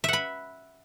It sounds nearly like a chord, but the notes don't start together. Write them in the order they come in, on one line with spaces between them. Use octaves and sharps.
E5 F#5 B5